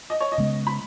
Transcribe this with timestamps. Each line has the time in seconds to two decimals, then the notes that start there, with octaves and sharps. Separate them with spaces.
0.10 D#5
0.20 C#5
0.32 D#5
0.38 C#3 G#3 B3
0.67 B5